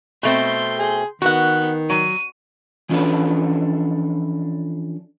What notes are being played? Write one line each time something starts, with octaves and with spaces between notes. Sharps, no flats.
B2 A3 C4 C6 G6
G#4
D#3 B3 F#4 F#5
F#3 D#7
E3 F3 C#4 D4 A4 B4